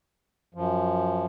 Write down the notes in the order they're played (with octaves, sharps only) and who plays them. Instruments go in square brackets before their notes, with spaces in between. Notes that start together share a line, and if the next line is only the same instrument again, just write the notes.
[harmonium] F#2 F3